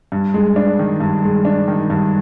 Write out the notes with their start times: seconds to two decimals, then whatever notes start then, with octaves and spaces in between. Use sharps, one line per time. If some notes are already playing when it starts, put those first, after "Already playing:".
0.12 G2
0.34 G#3
0.56 D4
0.79 D#3
1.00 G2
1.24 G#3
1.45 D4
1.68 D#3
1.90 G2